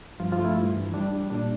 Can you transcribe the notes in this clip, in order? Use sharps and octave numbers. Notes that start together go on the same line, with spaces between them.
G2 F3 F4
F3 F4
A3
E4
G2
E3
G3 D4
G3
A#2 D4